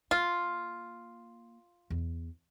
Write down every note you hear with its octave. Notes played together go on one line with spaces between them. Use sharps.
A#3 F4
E2